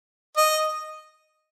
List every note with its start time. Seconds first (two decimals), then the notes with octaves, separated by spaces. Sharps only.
0.37 D#5